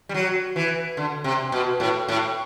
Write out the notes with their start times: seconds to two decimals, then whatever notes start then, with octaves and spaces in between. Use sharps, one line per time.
0.09 G3
0.14 F#3
0.56 E3
0.97 D3
1.24 C3
1.52 B2
1.80 A2
2.08 A2